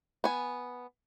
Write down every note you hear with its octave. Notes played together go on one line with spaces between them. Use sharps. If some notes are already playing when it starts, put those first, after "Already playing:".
B3 G#5